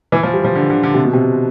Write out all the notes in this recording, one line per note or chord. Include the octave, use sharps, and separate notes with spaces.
E3
F3
G3
F3
D3
D3
D3
C3
B2
C3